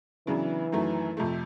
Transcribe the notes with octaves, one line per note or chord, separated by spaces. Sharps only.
C#3 E3 F#3 B3 D4
F#2 D#3 F#3 A3
F2 C3 F3 A3